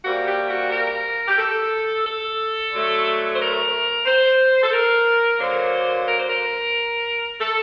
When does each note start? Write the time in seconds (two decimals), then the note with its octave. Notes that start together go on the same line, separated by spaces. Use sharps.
0.04 C3 G3 A#3 F#4
0.26 G4
0.48 F#4
0.71 A#4
1.28 G4
1.38 A4
2.05 A4
2.72 D3 F#3 A3
3.34 C5
3.38 A#4
4.06 C5
4.63 A4
4.72 A#4
5.39 D3 F#3 A#3 C5
6.06 A#4
6.17 C5
6.27 A#4
7.40 A4